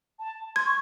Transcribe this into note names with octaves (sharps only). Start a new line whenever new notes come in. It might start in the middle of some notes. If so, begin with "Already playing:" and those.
A5
C6 G#6
C#6